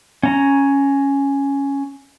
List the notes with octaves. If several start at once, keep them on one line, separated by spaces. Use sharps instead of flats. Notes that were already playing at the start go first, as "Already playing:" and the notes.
C#4 A#5